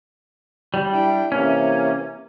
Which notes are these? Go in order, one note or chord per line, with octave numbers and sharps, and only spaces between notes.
G3
D4 E4 G5
C3 E3 A#3 C#4